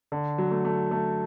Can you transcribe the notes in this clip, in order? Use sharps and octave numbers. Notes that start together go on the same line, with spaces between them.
D3
F#3
A3
A3
A3